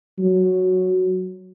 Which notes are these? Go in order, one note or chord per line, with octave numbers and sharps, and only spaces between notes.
F#3